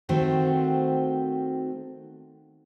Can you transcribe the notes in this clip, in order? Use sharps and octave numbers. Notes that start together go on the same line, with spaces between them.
D#3 A3 C4 F#4 C5